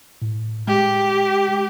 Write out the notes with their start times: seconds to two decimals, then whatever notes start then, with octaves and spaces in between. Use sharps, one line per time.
0.22 A2
0.68 G#3 G4